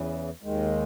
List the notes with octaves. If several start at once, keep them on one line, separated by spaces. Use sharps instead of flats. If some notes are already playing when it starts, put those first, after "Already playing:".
Already playing: E2 C#3 E3
D#2 D#3 G#3